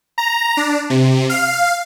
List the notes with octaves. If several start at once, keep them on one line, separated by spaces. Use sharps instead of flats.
A#5
D4
C3
F5